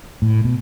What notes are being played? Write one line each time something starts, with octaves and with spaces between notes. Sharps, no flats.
A2
B2